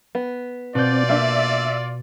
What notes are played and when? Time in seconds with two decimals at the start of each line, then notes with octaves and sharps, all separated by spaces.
0.15 B3
0.75 B2 C4 F4 D5 G6
1.09 A#3 D4 E5